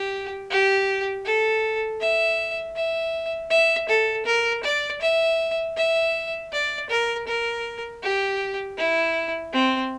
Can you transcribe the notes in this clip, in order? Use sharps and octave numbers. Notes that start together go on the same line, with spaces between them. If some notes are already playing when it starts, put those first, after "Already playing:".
Already playing: G4
G4
A4
E5
E5
E5
A4
A#4
D5
E5
E5
D5
A#4
A#4
G4
E4
C4